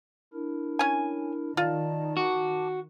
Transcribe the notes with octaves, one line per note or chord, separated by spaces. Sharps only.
D4 E4 A#4
C#4 G#5
D#3 F4 D5 A5
F#4 A5 D6